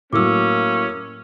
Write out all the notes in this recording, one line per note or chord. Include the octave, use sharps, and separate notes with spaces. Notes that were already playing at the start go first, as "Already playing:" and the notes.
A2 F#3 A#3 C#4 D6 E6